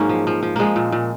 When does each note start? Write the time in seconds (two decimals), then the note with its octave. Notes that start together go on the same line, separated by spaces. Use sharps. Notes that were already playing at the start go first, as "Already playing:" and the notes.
Already playing: G#2 F#3 A#3 C#4
0.09 F3
0.27 F3
0.43 F3
0.56 F3 G#3 A#3
0.76 A#2
0.92 A#2